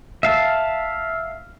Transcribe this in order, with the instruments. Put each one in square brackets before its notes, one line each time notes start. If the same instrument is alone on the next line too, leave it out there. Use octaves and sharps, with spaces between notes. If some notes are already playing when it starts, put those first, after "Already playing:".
[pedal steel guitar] E5 F5 A5